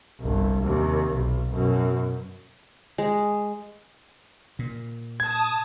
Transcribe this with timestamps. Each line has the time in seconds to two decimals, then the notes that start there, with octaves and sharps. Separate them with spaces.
0.21 G1 C2
0.63 D#2 C3
1.14 B1
1.51 F#2 B2
2.98 G#3
4.59 A#2
5.20 A5 D#6 G#6